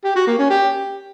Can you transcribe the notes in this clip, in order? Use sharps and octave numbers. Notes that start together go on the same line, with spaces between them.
G4
F#4
A#3
C#4
G4